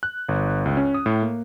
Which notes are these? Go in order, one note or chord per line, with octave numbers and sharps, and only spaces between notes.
F#6
G1
C#2
C#4
D#6
A2
A#3